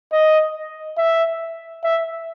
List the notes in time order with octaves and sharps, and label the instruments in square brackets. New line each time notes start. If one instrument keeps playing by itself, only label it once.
[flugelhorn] D#5
E5
E5